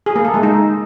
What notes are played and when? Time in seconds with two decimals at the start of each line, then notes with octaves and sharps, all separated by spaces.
0.06 G#4
0.16 A#3
0.25 A4
0.34 G#3
0.43 D#4